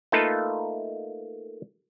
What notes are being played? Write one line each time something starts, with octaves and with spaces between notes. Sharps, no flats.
A3 A#3 D#4 F4 A4 B4